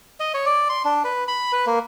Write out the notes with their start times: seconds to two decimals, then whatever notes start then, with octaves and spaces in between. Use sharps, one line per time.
0.20 D#5
0.34 C#5
0.46 D5
0.69 C6
0.85 D4
1.04 B4
1.28 B5
1.53 B4
1.66 A#3